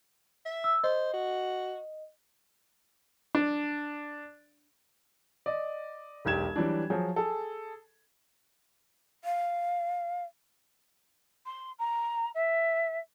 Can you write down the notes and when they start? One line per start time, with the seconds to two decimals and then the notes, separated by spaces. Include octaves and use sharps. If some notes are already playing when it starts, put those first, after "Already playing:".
0.46 E5
0.64 E6
0.84 C5 D#5
1.14 F#4
3.35 D4
5.46 D5 D#5
6.25 E1 B1 G4 G#6 E7
6.56 E3 F#3 G3 D4
6.90 F3 F#3 G#4
7.16 G#4 A4
9.24 F5
11.46 C6
11.79 A#5
12.35 E5